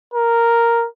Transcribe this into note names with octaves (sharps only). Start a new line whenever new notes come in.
A#4